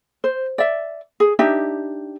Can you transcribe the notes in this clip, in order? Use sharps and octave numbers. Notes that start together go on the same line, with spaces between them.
C5
D5 E5
G#4
D4 D#4 G4 E5